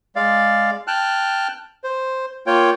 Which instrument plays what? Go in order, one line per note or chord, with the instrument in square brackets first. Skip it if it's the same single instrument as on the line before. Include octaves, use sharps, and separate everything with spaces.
[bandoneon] G#3 D5 F5
G5 A5 F6 F#6
C5
A#3 F4 C#5 G5